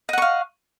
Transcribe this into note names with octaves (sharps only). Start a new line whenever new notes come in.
D#5 F5 F#5 C#6